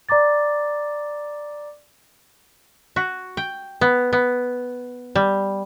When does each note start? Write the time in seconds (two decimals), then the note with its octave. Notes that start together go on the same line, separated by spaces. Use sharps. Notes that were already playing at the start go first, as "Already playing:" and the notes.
0.09 D5 A#5 D6 A6
2.96 F#4
3.37 G5
3.81 B3
4.13 B3
5.15 G3